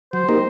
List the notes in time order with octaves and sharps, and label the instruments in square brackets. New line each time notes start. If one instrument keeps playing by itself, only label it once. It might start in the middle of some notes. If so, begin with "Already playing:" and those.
[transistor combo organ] F#3 [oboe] C5
[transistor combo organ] A#3 D#4 G4 A#4